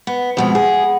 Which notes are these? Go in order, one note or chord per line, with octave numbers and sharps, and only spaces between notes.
B3
F2 B2 G#3 B3
G#4